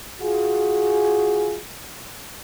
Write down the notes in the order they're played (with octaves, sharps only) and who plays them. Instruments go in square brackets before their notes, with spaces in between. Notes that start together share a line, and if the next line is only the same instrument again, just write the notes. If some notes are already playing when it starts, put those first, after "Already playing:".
[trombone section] F4 F#4 G#4